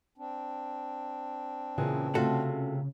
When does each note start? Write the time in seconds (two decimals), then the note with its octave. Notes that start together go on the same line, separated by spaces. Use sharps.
0.18 C4 D4
1.78 A#2 C#3 E3 G#4
2.15 C3 A3 F4 F#4 A4